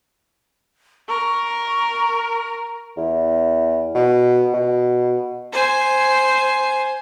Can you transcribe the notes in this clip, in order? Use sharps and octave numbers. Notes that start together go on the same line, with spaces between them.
A#4 C#6
E2
B2
B2
C5 G#5